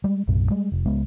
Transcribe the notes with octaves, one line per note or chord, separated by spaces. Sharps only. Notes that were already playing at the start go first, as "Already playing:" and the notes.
G3 G#3
B1 F#2 A2
G3 G#3
F1
C#2 G#3 B3